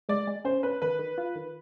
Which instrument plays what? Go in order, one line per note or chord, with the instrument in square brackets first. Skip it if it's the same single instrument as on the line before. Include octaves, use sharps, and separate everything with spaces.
[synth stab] G#3 [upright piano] D5
[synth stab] G#3
[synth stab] C#4 [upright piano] C5
[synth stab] C#4 [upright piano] B4
[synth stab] D#3 [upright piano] B4
[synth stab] D#3
F4
D#3